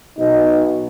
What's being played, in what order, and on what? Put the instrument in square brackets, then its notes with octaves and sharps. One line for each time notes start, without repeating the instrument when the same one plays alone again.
[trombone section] B1 B2 [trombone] D#4